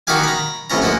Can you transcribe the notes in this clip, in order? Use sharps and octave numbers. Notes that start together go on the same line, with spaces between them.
D#3 D#4 F#4 G4 F5 G#5
A#5 B5
A1 C3 F3 C#4 A#5
G#3 A#3 F#4